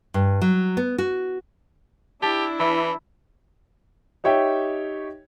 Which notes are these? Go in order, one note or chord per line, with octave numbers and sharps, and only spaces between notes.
G2
F#3
B3
F#4
D4 E4 G4 A5 B6
E3 E5 B5
D#4 G4 C#5 E5 G5